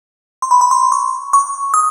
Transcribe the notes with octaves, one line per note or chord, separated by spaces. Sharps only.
C6
B5
B5
C6
C#6
C#6
D#6